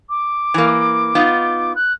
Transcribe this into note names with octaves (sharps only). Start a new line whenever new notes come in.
D6
E3 A#3
B3 D#4 F4
F#6